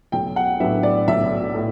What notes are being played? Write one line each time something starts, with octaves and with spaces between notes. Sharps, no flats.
B1 G5
F#5
A2 F#3 B3 D4 E5
D5
B1 E5
A2